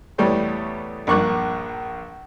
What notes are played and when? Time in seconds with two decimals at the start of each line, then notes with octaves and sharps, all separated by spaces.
0.18 E2 G3 A3 B3 C#5 G5
1.07 A#1 G2 A#3 C#6 D6 F#6